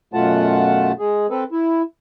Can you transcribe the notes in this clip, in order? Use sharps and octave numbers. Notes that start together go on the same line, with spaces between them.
F#2 B2 A3 F4 F#5 A5
G#3 G#4
C4 A4 B4
E4